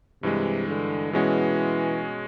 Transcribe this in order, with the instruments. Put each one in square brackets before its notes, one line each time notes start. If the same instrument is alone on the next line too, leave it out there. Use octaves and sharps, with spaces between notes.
[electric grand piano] G2 E3 G#3 [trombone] C3
[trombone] D3
[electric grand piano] B2 G#3 C#4 F#4 [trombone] E3